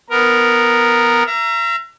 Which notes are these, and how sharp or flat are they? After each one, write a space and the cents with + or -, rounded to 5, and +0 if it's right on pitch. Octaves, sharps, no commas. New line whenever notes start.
B3 +0 A#4 +0
E5 +40 A#5 +0